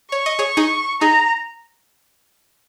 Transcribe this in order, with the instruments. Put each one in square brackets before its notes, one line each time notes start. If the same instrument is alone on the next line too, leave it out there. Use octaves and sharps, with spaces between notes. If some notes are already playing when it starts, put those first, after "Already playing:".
[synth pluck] C#5 [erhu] C#6
[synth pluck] D#5
G#4 C#5
D#4 G#4
[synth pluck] D#4 G#4 [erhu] A#5